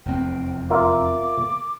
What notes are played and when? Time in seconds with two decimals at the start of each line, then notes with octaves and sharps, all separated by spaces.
0.06 F1 E2 C4 G5
0.70 F4 A#4 E5 D6